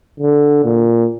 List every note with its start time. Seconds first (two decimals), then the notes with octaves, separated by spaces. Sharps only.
0.20 D3
0.65 A#2